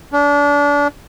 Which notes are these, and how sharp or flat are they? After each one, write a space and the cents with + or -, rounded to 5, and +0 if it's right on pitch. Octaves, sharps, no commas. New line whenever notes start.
D4 -30